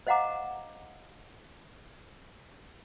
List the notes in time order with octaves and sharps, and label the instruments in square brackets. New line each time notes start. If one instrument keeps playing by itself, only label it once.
[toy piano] C5 D#5 F5 F#5 A#5 D6